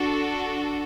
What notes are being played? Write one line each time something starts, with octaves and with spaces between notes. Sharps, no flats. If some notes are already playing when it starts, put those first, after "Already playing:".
Already playing: D4 F#4 A4